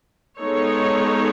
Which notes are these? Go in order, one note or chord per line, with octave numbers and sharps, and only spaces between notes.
G#3 B3 D#4 A4 C#5